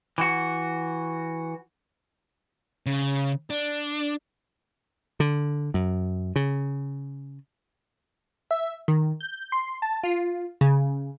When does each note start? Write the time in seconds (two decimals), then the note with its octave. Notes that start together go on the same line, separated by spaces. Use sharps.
0.18 E3 F#4
2.86 C#3
3.50 D4
5.20 D3
5.74 F#2
6.36 C#3
8.51 E5
8.88 D#3
9.21 G6
9.52 C6
9.82 A5
10.03 F4
10.61 C#3